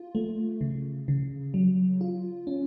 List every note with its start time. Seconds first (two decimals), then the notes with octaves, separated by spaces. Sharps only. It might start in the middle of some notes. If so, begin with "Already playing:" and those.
Already playing: F4
0.15 A3
0.61 C#3
1.08 C#3
1.54 F#3
2.01 F4
2.47 C#4